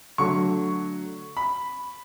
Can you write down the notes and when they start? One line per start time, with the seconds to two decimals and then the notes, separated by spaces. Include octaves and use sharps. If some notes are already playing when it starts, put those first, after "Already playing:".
0.18 D3 F#3 A3 C#6
1.37 B5